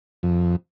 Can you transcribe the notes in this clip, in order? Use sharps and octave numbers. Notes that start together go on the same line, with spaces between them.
F2